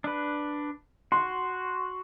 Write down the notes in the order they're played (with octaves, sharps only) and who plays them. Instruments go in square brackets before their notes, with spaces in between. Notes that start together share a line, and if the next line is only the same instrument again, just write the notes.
[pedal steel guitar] D4 B4
[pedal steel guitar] F#4 [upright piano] C6